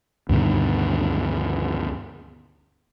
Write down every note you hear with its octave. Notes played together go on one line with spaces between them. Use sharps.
D2 G2 B2 D#3